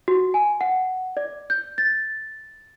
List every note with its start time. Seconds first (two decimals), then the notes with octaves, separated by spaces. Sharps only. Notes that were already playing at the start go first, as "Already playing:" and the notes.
0.08 F#4
0.34 G#5
0.61 F#5
1.17 D5
1.50 G6
1.78 A6